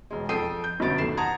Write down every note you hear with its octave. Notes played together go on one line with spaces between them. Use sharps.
E1 G#3
F2 A4 G5 D#6 C7 D#7
G6
G1 F#2 B2 B3 A6 D7
D#2 A3 C7 E7
F#5 A5 A#5 D#6 G#6